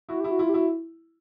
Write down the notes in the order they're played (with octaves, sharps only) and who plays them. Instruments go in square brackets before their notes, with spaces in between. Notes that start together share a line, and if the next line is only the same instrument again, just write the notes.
[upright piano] E4 [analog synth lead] F#4
[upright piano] E4 [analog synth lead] G4
[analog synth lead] F#4
[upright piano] E4 [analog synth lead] F4
[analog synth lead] G4
[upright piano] E4 [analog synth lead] F#4